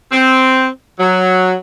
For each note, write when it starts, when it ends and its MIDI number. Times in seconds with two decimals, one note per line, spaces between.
0.12 0.67 60
1.00 1.53 54